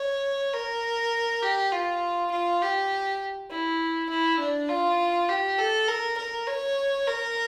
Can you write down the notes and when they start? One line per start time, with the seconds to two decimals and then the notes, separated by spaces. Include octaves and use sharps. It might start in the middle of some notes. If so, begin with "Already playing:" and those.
Already playing: C#5
0.54 A#4
1.43 G4
1.72 F4
2.31 F4
2.62 G4
3.51 E4
4.09 E4
4.39 D4
4.69 F4
5.29 G4
5.59 A4
5.88 A#4
6.18 A#4
6.47 C#5
7.07 A#4